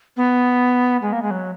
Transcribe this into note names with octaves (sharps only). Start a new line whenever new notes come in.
B3
G#3
A#3
G#3
F#3